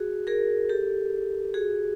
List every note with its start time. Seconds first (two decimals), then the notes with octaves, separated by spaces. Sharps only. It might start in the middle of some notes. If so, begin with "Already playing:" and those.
Already playing: F#4 G#4
0.27 G#4 A#4
0.69 G4 A4
1.54 F#4 G#4